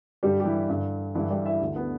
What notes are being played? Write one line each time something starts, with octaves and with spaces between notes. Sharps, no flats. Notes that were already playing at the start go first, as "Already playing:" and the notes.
G2 D3 G3 G4
G4
E3 E4
G2 D3
G2 D3 E3 E4
G3 G4
E4 E5
D2 D3
B3 B4